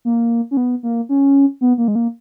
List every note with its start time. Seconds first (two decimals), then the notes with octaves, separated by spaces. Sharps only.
0.05 A#3
0.51 C#4
0.57 B3
0.83 A#3
1.09 C#4
1.61 B3
1.78 A#3
1.88 G#3
1.95 A#3